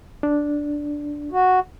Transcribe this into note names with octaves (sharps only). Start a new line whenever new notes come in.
D4
F#4